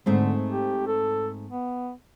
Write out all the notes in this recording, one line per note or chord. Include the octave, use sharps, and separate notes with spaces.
G#2 D3 A3 C4
G4
A4
B3